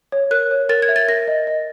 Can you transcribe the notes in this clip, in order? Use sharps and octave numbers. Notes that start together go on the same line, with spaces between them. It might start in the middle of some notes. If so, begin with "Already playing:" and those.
C#5
A#4 F#6
C#5
A#4 A6
G#6
E5
A6
A#4 A#6
D#5
D#5